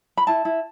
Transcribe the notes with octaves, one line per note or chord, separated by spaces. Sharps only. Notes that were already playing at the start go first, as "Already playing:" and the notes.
B5
E4 A5
E4